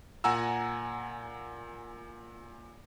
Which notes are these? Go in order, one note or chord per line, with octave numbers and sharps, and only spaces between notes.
A#2 F#5 G#5 A#5 E6